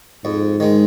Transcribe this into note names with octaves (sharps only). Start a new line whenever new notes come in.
F2 G#2
D#3 G#3